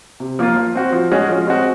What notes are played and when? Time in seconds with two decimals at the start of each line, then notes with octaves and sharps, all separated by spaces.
0.20 C3
0.39 F3 A#3 F4
0.56 F3
0.75 C4 F#4
0.93 F3
1.12 G#3 C#4 F#4
1.29 F3
1.47 G#3 C4 F#4